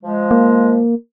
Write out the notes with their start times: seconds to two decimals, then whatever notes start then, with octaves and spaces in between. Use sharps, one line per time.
0.04 F3 G#3
0.31 A#3